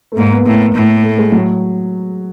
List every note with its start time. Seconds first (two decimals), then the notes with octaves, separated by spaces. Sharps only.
0.12 A3
0.17 G#2 A#3
0.31 B3
0.45 A2 A#3
0.75 A2
1.03 A3
1.18 G#3
1.32 F#3